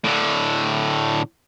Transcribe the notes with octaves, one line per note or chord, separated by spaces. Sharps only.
A2 D3